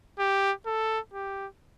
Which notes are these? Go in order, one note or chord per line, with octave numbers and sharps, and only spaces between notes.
G4
A4
G4